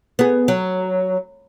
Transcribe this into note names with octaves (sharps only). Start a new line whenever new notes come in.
B3 G#4
F#3